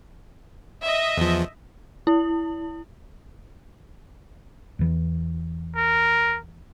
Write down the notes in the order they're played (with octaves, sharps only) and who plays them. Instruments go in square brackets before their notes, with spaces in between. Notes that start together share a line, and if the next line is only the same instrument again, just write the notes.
[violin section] D#5 E5
[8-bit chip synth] E2 F3
[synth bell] E4
[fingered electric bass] E2 E3
[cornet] A#4